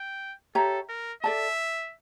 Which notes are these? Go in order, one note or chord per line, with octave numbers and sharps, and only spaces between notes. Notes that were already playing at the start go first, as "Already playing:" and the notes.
Already playing: G5
G4 A4 C#5 E5 A#5
A#4
A4 D5 E5 A5